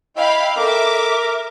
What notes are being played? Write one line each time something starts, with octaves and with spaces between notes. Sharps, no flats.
E4 D#5 F5 G5 B5
A4 A#4 E5 D6